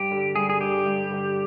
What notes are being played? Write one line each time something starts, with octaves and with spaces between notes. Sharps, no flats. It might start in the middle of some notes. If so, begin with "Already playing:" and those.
Already playing: G2 G4
D3 G3
G2 G#4
G#4
D3 G3 G4
G2
D3 G3